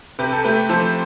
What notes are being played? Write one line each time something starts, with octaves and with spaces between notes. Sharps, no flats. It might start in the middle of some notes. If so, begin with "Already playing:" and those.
C3 G4 B4
A4
A3 G4 B4
F3 A4 C5